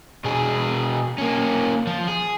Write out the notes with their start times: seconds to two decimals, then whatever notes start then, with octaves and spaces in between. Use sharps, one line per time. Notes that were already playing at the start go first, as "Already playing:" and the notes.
0.25 B2 G#4
1.18 A#3 C#4
1.87 F3
2.08 G#4